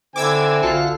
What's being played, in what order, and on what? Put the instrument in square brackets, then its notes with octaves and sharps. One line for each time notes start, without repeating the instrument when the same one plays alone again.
[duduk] D3 [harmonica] C4 E4 G#5 [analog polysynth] D6 E6 G#6
[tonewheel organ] B1 F4 F#4 [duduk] D3 [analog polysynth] A4 F5